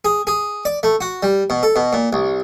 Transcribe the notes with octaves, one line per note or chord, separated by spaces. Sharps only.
G#4
G#4
D5
A3
F#4
G3
B2
A4
B2
A#2
C2